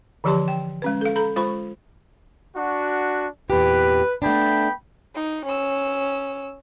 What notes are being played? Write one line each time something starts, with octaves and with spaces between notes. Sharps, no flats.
D3 E3 F3 G4 A5 C6
G5
G#3 C#4 B4
A4 F5
A4 A#5 B5
G#3 F4 C5 B5 C#6
D4 F#4
E2 A#2 G4 B4
A3 B3 D4 G5 B5
D#4
C#4 E6